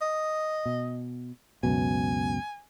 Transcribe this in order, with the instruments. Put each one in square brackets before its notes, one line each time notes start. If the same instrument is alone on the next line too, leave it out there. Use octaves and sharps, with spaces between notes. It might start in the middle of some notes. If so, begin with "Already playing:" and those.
[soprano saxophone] D#5
[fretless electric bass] B2
[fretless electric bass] C#2 F#2 B2 [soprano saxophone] G#5